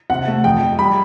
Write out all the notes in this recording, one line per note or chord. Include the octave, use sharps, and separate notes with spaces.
C3 F#5
A3
F2 G5
F2
G3 B5